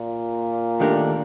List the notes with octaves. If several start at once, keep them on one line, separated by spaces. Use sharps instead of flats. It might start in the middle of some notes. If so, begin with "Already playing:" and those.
Already playing: A#2
D#3 A3 D4 G4 A#4